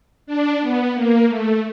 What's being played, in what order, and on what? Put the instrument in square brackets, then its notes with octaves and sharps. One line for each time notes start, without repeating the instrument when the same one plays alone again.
[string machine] D4
B3
A#3
A3